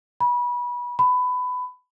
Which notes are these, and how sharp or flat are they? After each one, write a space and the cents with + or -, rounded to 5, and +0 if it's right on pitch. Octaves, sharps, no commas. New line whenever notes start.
B5 -25
B5 +20